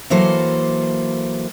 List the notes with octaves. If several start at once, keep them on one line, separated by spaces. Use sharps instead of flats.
E3 F#3 A#3 A4 C5